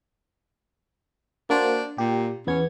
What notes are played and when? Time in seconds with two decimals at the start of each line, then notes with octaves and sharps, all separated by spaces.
1.50 A#3 D4 F#4 C5
1.98 A#2 G4
2.47 E2 B3 C#4 G#6